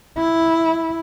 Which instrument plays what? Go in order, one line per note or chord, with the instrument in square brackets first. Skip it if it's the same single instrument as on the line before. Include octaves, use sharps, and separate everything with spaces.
[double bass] E4